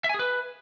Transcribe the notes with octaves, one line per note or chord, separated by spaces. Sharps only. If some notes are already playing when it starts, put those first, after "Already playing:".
E5
G#5
G#4
B4